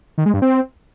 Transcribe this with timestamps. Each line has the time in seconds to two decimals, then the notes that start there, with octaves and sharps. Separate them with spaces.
0.18 D#3
0.26 G#3
0.34 G2
0.42 C4